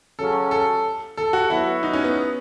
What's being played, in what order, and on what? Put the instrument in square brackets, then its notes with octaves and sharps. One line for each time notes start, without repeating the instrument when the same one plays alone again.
[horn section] C#3 F#3 C#4 [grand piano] A4
[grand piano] A4
A4
F#4
[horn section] F#3 B3 F#4 [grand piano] E4
[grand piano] D#4
C#4
B3